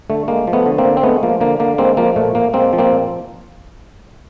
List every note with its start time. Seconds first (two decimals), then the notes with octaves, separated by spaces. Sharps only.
0.10 D3 A3
0.28 G#3 A#3
0.47 F3
0.53 A3 B3
0.66 D3
0.78 A#3 C4
0.85 D3
0.97 C4
1.03 G#3 A3 B3
1.23 F3 A#3
1.41 D3 A#3
1.60 D3 A#3
1.78 G#3 A#3 C4
1.97 F3 A#3
2.16 A#2 A3
2.35 A#2 A#3
2.53 G#3 A#3 C4
2.73 F3
2.78 A#3 C4
2.92 A#2